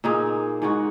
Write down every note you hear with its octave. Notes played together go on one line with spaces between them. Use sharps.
A#2 A#3 D#4 G#4
G#2 G#3 F#4